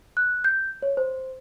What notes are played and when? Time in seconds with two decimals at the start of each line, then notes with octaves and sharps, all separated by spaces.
0.17 F#6
0.44 G6
0.82 C#5
0.97 C5